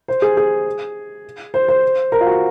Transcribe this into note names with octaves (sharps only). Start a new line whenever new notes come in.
C5
G#4
G#4
C5
C5
A#4
F4
F#4